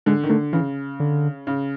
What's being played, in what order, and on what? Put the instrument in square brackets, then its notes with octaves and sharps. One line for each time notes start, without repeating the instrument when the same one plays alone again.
[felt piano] D3 [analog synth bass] G#3
[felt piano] D#3
[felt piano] D3 [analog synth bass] A3
[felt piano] C#3 [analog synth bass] E3
[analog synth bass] D3
[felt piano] C#3